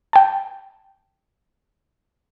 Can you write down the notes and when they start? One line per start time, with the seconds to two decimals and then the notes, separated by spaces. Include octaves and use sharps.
0.13 G5 A5